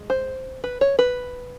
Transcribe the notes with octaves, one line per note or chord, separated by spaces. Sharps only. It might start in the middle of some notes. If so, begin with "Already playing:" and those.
Already playing: G#3
C5
B4
C#5
B4